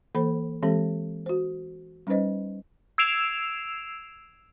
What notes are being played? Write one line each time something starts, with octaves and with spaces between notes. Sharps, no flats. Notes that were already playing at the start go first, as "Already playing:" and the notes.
E3 A#3 A4 C5 B5
E3 G#3 C4 G4 A4
F#4 C5
G3 C#4 D#4 B4 C5 D#5
E6 G#6 C7 D7 E7 F7